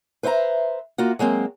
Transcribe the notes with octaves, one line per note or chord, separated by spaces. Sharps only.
B4 C5 E5 F#5 A#5
A#3 F4 F#4
F#3 G#3 A#3 C4